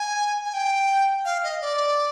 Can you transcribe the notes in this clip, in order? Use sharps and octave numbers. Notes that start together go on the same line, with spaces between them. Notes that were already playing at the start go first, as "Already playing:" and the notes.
Already playing: G#5
G#5
G5
F5
D#5
D5